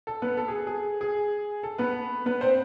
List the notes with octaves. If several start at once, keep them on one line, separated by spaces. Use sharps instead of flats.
A4
B3 B4
A4
G#4
G#4
G#4
A4
B3 B4
B3 B4
C4 C5